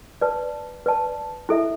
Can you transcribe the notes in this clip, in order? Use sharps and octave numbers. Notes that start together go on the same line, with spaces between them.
B4 D5 A5
B4 D5 A5
E4 A4 E5